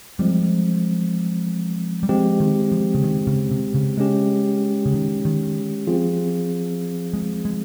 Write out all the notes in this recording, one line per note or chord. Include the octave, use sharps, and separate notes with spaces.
F3 G3 G#3 C4
G3
F3 G#3 C4 G4
D#3
F3
C#3
D#3
C#3
C3
C#3
G#3 C#4 G4
C#3
D#3
D#3
F3 C4 F4 G#4
G#3
G#3